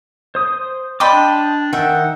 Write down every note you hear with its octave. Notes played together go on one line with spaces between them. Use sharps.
C5 D#6
D5 D#5 G5 B5 C6 D6
D4 A5
D#3 E5 F#5 G5